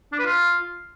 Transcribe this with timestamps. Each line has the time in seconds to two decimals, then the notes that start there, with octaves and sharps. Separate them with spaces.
0.12 D4
0.19 B4
0.25 F4